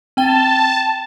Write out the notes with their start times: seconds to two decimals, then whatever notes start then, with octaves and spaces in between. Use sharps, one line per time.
0.17 C4 G5 A5 G7